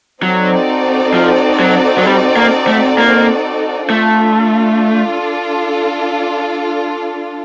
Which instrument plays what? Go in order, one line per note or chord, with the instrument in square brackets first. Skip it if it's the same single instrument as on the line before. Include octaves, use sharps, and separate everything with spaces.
[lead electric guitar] F#3 [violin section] C4 D#4 F#4 A4 D5
[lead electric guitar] F3
F#3
F#3
G3
A#3
A3
A#3
[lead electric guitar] A3 [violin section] D4 F4 A4